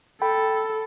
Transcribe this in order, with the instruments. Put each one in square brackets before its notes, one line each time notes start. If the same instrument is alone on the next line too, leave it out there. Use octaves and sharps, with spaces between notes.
[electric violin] A4 [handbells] G5 B5